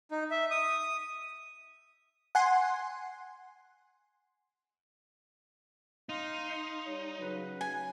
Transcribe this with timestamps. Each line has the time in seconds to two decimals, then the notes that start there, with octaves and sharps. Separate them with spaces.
0.11 D#4
0.31 E5
0.51 D#6
2.35 F#5 G#5 C6
6.09 D#4 F5 C6
6.85 G3 C#5
7.19 C#3 F#3 B4
7.61 G#5